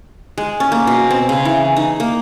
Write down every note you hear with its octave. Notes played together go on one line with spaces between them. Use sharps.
G#3
C#4
A#3
B2
C4
C#3
E3
D#4
A#3